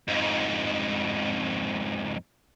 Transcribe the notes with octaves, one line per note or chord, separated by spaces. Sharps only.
F2 G#2